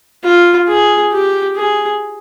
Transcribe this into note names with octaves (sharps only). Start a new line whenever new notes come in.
F4
G#4
G4
G#4